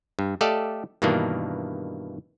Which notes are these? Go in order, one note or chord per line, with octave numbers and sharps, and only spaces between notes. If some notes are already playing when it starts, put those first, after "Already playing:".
G2
A3 G4 A4 D5 D#5 F5
G2 B2 D#3 E3 A#3 D4